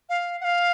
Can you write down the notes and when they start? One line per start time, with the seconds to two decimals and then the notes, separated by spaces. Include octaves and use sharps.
0.09 F5
0.41 F#5
0.44 F5